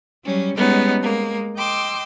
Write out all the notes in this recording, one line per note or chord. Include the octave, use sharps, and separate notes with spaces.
F#3 G3 C#4
G3 G#3 B3 C#4 D#4
G#3 A#3
D#5 G5 C6 D6 E6